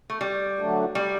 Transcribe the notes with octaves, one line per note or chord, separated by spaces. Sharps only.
A3
G3
D3 F#3 A3 D4
G3